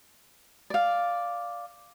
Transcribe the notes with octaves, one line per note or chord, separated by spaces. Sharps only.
D5 F5